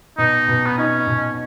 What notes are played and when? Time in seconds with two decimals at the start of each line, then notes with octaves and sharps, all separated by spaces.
0.18 B2 D#4
0.48 B2
0.66 B3
0.78 C#4 D#4
1.07 B2